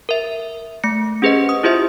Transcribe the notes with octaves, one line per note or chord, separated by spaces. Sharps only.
A#4 E5
A3 C#7
C#4 G4 G#4 B4 C5 D#5
D#6
E4 F4 G4 C5 E5